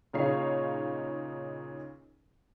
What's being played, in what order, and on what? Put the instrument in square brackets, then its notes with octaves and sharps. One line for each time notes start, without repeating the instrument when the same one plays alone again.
[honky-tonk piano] A#2 C#3 D#4 C#5 F5 C7